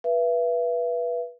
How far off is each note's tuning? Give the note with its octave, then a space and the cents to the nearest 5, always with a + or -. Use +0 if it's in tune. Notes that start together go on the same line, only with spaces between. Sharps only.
B4 -20 E5 +35